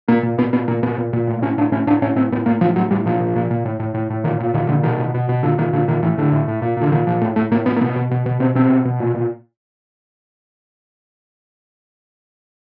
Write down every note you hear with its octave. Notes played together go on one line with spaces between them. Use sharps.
A#2 A#3
A#2
A#2 B3
A#2 B3
A#2 A#3
A#2 B3
A#2
A#2
A2
A2 C#4
A2 D4
A2 C#4
A2 D4
A2 C#4
A2 C4
A2 B3
A2 A#3
A2 F3
A2 F#3
A2 G3
A#2 F3
A#2
A#2
A#2
A2
A2
A2
A2
A#2 D#3
A#2
A#2 D#3
A#2 D3
B2 D#3
B2
B2
B2
A#2 D3
A#2 D#3
A#2 D3
A#2 D#3
A2 E3
A2 D3
A2
A2
A#2
A#2 D3
A#2 D#3
A#2 F3
A2 A3
A2 A3
A2 A#3
A2 B3
A#3
B2 B3
B2
B2
B2
B2 C4
B2 C4
B2
B2
A#2
A#2